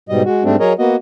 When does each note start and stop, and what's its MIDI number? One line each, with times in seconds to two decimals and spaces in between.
0.09 0.22 44
0.09 0.22 47
0.09 0.22 55
0.09 0.22 75
0.25 0.43 56
0.25 0.43 66
0.44 0.56 44
0.44 0.56 55
0.44 0.56 57
0.44 0.56 60
0.44 0.56 62
0.60 0.73 54
0.60 0.73 68
0.60 0.73 70
0.60 0.73 73
0.60 0.73 75
0.79 0.96 58
0.79 0.96 59
0.79 0.96 66
0.79 0.96 75